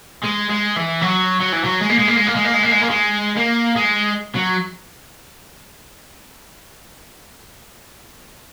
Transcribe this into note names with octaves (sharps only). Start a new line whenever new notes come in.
G#3
G#3
E3
F#3
F#3
E3
F#3
G#3
A#3
G#3
A#3
G#3
A#3
G#3
A#3
G#3
A#3
G#3
A#3
G#3
A#3
G#3
F#3